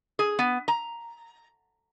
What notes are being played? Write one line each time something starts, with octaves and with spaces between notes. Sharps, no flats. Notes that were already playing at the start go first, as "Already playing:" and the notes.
G#4
B3
A#5